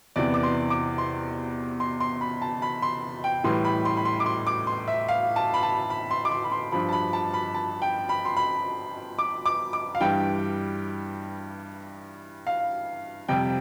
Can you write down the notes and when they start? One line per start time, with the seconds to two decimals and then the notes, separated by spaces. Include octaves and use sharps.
0.16 E2 C3 E3 D5
0.34 D6
0.43 C6
0.70 D6
0.98 C6
1.80 C6
2.00 C6
2.21 B5
2.42 A5
2.62 B5
2.82 C6
3.24 G5
3.44 A2 E3 G3 C6
3.65 B5
3.85 C6
3.97 B5
4.05 C6
4.20 D6
4.26 C6
4.47 D6
4.67 C6
4.88 E5
5.09 F5
5.36 A5
5.54 B5
5.63 A5
5.90 B5
6.11 C6
6.25 D6
6.31 C6
6.44 B5
6.52 C6
6.72 G2 F3 B5
6.89 A5
6.93 B5
7.13 A5
7.34 B5
7.54 A5
7.82 G5
8.09 B5
8.25 C6
8.37 B5
9.19 D6
9.46 D6
9.73 D6
9.95 F5
10.01 G2 E3 G3 G5
12.47 F5
13.29 F2 C3 G3 G5